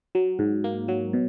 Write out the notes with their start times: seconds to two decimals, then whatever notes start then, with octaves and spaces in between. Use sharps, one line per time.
0.15 F#3
0.39 G#2
0.64 A#3
0.88 F#3
1.13 B2